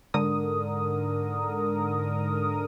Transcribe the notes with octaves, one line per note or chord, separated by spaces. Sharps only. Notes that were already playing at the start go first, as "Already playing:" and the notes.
G#2 D3 A#4 D#6